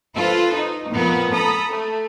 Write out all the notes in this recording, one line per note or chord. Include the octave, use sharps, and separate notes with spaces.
F4 A4 B4 C5
D#4
F2 A#2 B3 A#4
A4 A#5 B5 D#6
A3